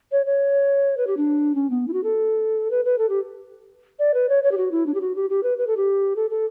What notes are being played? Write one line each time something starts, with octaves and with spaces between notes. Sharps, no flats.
C#5
C#5
B4
G4
D4
C#4
B3
E4
F#4
A4
B4
B4
A4
G4
D5
B4
C#5
C#5
G4
F#4
E4
D4
G4
F#4
G4
G4
B4
B4
A4
G4
A4
A4